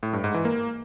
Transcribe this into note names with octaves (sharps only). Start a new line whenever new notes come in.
A2
G2
G#2
E3
A#3